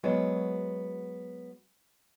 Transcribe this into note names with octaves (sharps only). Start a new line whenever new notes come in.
F#3 G#3 B3